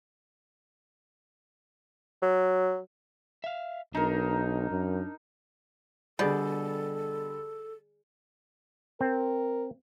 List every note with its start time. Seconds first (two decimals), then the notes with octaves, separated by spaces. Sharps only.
2.22 F#3
3.44 E5 F5
3.95 B1 D4 D#4 A#4
4.71 F#2
6.19 B2 D3 G3 G#4 A4 D5 G6
9.01 C4 A#4